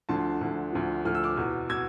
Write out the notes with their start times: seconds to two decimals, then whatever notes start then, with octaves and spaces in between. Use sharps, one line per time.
0.09 D2 D3 F3 A5 C6
0.41 D2 D3 F3
0.73 D2 D3 F3
1.05 D2 D3 F3 F6
1.15 E6
1.24 D6 F6
1.37 E2 B2
1.69 B2 E6 G#6